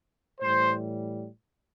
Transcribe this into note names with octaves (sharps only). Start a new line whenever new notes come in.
A2 E3 G3 C5